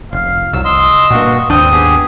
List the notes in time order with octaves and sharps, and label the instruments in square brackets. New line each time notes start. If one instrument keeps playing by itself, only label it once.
[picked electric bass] F1 [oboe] F5
[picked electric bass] C2 [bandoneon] F#3 E6
[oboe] D#5 [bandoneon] C6 E6
[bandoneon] G2 F#4 [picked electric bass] A#2 A#3
[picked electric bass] G#1 D#2 D4 [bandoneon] C4 G6 [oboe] D#6
[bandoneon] B3 G4 G#4